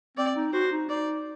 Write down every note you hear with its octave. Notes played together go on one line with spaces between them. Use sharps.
C4 D5
D#4
F#4 C5
D#4
D#4 D5